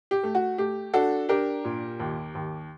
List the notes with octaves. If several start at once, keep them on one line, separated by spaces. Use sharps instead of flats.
G4
A3
F#4
A3 G4
D4 F#4 A4
D4 G4 A#4
A#2
D#2
D#2